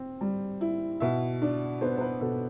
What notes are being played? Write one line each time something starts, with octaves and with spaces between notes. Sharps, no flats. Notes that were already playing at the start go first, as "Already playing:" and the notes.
Already playing: C4
G3
E4
B2 E5
D4
B3 C5
C5
B4
B2 A4